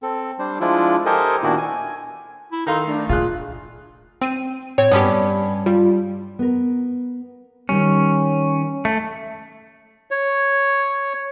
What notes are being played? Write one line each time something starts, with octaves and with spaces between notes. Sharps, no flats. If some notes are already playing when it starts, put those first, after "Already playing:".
C4 A4
G3 D4 C5
F3 G#3 D4 E4 F4
G4 A4 A#4 C5 D#5 G#5
A#2 D#3 B3 D4 E4 F#4
G#5
E4
D#3 D#4 A4 F5 C6
A3 D4
A#2 F4 G#4 F#6
C4 D#7
A2 C4 C#5 G#6
G2 B3 C#4 G4 D5 A5 B5
G3 F4
B3 A#4
D#3 G3 C#4
A3
C#5